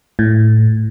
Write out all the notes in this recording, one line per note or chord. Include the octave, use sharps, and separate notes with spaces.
A2